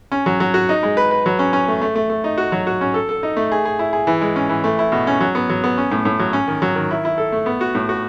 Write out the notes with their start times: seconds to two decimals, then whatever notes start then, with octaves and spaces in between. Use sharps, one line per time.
0.12 C#4
0.26 F#3
0.40 F#3
0.54 F#4
0.69 D#4
0.83 G#3
0.97 B4
1.11 B4
1.26 F#3
1.39 C#4
1.53 C#4
1.68 A3
1.81 A3
1.96 A3
2.10 A3
2.24 D#4
2.38 F#4
2.52 F#3
2.67 F#4
2.81 C#4
2.94 A4
3.09 A4
3.23 D#4
3.37 A3
3.52 G#4
3.65 G#4
3.79 E4
3.93 G#4
4.07 E3
4.21 G#3
4.36 C#4
4.49 E3
4.64 A3
4.79 E4
4.92 B2
5.07 C#4
5.20 F#3
5.35 B3
5.49 F#3
5.64 B3
5.78 C#4
5.91 A2
6.05 A2
6.20 F#3
6.33 C#4
6.48 D#3
6.62 F#3
6.75 D#3
6.91 E4
7.05 E4
7.18 A4
7.32 A3
7.46 B3
7.61 F#4
7.75 A2
7.89 F#4